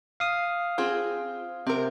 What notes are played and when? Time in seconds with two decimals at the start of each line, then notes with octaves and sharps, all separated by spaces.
0.20 F5 D#6
0.78 C4 F4 G#4
1.67 C3 C4 A#4